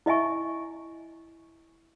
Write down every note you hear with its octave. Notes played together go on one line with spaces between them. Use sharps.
E4 D#5 E5 G#5 C#6